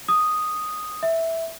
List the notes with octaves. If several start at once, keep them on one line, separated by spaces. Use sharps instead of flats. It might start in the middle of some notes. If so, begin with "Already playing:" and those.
D#6
E5